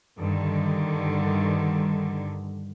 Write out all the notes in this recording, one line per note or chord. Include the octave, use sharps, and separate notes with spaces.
G2 D3 D#3